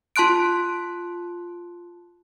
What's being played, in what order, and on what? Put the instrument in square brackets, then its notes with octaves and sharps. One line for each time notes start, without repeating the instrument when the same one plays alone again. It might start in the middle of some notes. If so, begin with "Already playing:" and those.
[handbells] F4 A5 C6 F#6 D7